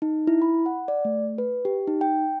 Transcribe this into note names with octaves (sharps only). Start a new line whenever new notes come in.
D#4
E4
B5
F#5
D5
A3
B4
G4
D#4
G5